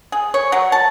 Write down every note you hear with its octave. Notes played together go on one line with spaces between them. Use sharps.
G#4
C#5
F#3
A5